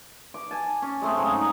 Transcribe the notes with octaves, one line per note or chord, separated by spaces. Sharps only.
D6
G#5 A5
C#4
G#3 A3 C4
G#2 C#3 F#3
D#4